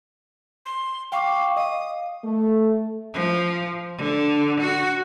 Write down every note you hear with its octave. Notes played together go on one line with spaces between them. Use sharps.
C6
F5 G5 C#6 D6
D#5 F5 D#6
A3
F3
D3
F#4